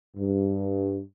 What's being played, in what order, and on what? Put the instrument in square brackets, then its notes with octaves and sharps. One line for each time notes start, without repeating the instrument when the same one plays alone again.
[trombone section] G2